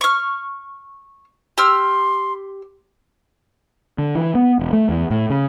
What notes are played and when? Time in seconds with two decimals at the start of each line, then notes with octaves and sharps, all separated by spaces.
0.01 C#6 F6
1.58 G4 C6 E6 F6
3.99 D3
4.15 E3
4.35 B3
4.59 E1
4.73 A3
4.89 E2
5.11 A2
5.30 C#3